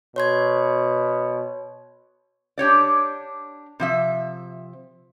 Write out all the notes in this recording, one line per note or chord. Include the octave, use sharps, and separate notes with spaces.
B2 C#5 C6 G#6
D4 G4 C#5 D5
C3 F3 E5